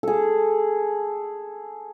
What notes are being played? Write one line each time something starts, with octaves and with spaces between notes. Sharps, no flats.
G#4 A4